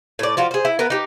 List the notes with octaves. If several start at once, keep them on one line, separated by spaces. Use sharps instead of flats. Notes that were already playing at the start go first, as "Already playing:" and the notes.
A2 D5
F3 F4 F#4
G#4 C5
E4
B3 A#4 B4
D#4 G4